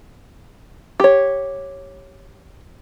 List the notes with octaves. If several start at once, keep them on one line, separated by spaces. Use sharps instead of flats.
G4 C#5